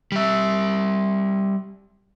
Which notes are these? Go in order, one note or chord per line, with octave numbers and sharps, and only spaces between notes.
G3 E5